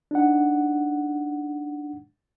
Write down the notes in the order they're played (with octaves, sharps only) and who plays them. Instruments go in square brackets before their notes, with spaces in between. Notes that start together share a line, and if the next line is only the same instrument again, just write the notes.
[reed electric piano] D4 D#4 F#5